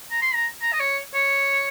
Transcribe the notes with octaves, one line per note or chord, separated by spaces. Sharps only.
A#5
C6
A#5
A#5
D#5
C#5
C#5